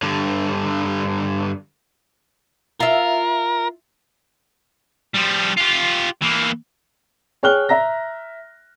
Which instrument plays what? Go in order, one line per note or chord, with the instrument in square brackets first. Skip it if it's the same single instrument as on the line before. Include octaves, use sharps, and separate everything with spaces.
[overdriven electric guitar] G2 D3
[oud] F4 E5 [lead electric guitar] A#4
[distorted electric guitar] F3 G3
F4 G4
E3 A#3
[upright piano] G#4 C#5 G5 F6 F#6 G7
E5 A#5 A#6